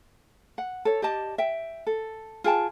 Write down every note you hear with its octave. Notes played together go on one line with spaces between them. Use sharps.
F#5
A4 C#5
G4 D5 D#5 A5
E5 G5
A4
F4 G#4 G5 A5